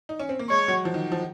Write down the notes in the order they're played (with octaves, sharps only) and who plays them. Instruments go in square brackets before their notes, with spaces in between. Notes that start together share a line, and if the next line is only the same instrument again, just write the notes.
[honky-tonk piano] D#4
C#4
C4
A#3
[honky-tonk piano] G#3 [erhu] C#5
[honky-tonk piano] F#3
F3
D#3
F3